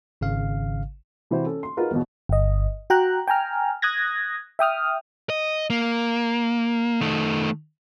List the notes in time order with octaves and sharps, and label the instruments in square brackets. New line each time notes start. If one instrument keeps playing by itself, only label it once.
[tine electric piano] G#1 C#3 F5
[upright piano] C3 E3 E4 F#4 C5
C#4 A4
C6
D#4 F4 F#4 G#4 A#4 B4
G1 E2 B2
[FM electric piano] G1 D#5
F#4 G5 A#5 F#6
G5 G#5 A#5 F6
D#6 F#6 G#6 A#6
E5 G5 D#6 F6
[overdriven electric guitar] D#5
A#3
D#3 A3